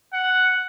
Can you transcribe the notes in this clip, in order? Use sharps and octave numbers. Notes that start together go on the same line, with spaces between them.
F#5